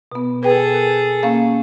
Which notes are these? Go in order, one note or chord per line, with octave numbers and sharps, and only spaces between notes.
B2 B3
G#4 A4 B4 G5
A#4
A#3 C#4 F5